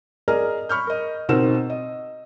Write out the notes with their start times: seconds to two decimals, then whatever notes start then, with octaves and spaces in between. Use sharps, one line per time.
0.28 G#4 A#4 D5 D#5 A#5 F6
0.69 B5 C#6 F6 G6
0.87 A#4 D#5
1.29 B2 C4 D#4 A#4 E6 E7
1.70 D#5